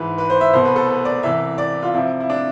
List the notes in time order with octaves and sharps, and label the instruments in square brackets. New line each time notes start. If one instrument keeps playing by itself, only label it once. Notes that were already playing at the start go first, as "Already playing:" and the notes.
Already playing: [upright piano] G#2 E3 B4
B4
C5
E5
C2 B2 C5
B4
A4
B4
D5
C2 C3 E3 E5
D5
F4
F2 C3 F3 E4
E4
D4